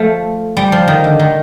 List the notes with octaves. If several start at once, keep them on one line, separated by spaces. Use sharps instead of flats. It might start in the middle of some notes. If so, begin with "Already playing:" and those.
Already playing: F3 A3
G3
F3
D#3
D3
D#3